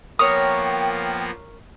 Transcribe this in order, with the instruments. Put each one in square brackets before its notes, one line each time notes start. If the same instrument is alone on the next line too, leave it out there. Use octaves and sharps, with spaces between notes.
[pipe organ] F3 A#3 B3 [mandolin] A#4 C#5 [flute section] G5 [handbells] D#6